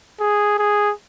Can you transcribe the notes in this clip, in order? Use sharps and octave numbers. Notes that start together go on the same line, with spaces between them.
G#4
G#4